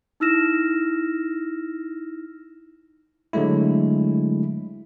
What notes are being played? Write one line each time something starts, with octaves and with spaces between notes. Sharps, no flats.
D#4 E4 E6 F6 A#6 E7
D3 F#3 G#3 A3 E4